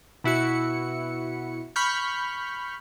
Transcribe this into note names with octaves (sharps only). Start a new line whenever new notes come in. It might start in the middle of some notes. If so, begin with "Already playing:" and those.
B2 E4 F#4 C#7
B5 C#6 F6 G6